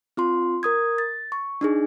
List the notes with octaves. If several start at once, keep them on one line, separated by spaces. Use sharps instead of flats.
C4 F4 C6
A#4 D#6 G#6
A6
C#6
D4 D#4 G#4